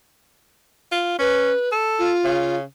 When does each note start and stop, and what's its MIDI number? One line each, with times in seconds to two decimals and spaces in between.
0.92 1.17 65
1.19 1.52 61
1.19 1.69 71
1.72 2.13 69
1.98 2.56 65
2.24 2.63 49